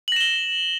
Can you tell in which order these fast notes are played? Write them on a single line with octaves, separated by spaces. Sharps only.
F#7 A#6 E7 G7